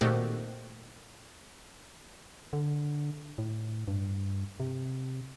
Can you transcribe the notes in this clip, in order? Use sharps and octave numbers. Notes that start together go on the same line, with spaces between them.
A#2 D#3 A3 C4 F#4 G4
D3
A2
G2
C3